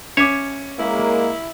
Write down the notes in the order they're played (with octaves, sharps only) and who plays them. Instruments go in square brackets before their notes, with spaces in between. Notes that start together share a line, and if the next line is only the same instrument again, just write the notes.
[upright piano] C#4 D6 [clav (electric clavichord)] C#5 E5
[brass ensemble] G#3 A#3 [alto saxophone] E4